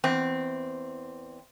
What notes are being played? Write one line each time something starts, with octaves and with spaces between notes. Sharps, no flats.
E2 C4